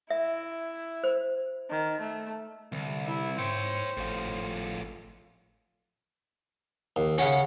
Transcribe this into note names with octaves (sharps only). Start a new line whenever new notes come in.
E4 E5
C5
D#3
A3
C2 D3
E4
G#2 C5 C#5 G5
G#1 A2 F3
D#2
C#3 C#4 F#5